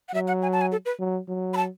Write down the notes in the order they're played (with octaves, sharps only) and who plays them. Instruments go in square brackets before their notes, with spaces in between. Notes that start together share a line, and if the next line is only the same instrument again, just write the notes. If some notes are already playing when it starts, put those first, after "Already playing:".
[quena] F#5
[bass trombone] F#3 [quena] E5
[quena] F#5
G#5
A5
G#5
A4
B4
[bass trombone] F#3
F#3
[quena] B5
A5